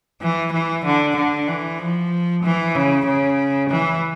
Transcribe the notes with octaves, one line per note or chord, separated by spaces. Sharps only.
E3
E3
D3
D3
E3
F3
E3
C#3
C#3
E3